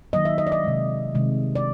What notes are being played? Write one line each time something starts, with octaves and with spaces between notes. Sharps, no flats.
D#3 F#3 A#3 D#5
E5
D#5
D5
D#5
C3 D#3 G#3
C3 D#3 G#3
D5